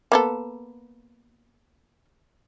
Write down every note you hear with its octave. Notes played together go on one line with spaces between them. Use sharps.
A#3 B3 A4